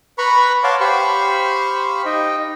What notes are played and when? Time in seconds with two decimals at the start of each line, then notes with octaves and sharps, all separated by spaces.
0.18 B4 A#5 B5 C#6
0.64 C#5 F5 F#5 A5 C6 D6
0.80 G4 C5 F5 B5 C#6
2.06 D#4 D#5 G5